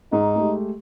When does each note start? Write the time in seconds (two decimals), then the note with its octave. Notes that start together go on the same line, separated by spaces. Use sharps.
0.12 G#2 D#4
0.36 G#3 A3 G4